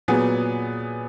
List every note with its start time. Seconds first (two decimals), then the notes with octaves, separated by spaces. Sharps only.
0.08 A#2 F#3 B3 G#4